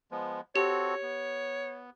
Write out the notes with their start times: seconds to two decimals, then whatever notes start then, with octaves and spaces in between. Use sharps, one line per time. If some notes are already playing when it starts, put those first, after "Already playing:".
0.11 F3 G#3 B3
0.56 C4 F#4 G4 A4 C#5
1.02 B3